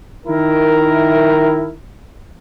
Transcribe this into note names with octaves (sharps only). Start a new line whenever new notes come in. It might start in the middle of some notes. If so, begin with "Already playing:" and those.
D#3 E4 A#4